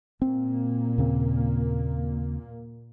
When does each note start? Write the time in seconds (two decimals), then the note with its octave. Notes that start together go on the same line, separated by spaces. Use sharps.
0.22 A#2 A#3 C4
0.98 D#2 C#3 C4